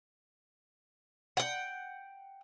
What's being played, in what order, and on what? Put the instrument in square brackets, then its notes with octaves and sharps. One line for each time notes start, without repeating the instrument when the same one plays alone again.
[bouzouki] F#5 G5